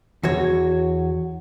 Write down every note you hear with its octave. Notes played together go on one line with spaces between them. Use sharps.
E2 F#4 C#5